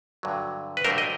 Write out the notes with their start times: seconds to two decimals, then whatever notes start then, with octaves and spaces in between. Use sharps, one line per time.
0.23 G2 D3 F#3 A3
0.77 B4
0.84 G2 D3 F#3 A3 A#4 C5
0.98 D#5